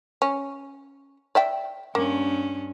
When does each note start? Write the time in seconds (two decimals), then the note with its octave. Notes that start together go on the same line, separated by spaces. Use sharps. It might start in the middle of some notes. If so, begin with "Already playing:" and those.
0.22 C#4
1.35 D5 E5 G5
1.95 G2 A#3 C#4